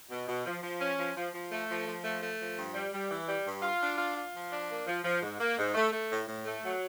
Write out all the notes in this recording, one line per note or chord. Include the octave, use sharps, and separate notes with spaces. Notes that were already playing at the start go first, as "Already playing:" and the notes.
B2
B2
F3
F3
C#4
F3
F3
F3
A3
F3
F3
A3
A3
F3
G2
G3
G3
E3
G3
G2
F4
D4
F4
F4
F3
D4
A#3
F3
F3
G#2
A#3
G#2
A3
A3
A2
A2
A3
F#3